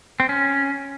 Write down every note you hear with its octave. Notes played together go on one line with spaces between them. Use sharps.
C4
C#4